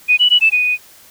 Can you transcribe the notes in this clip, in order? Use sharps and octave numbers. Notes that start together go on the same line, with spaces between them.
D#7
F#7
F#7
E7
D#7